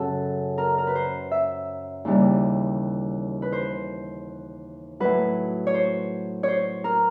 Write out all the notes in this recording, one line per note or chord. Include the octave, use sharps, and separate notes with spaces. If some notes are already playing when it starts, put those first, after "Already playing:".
Already playing: F#2 C#3 F#3 A4
A#4
A#4
B4
C5
E5
D#2 C#3 E3 G3
B4
C5
A2 F#3 B4
C#5
C5
C5 C#5
A#4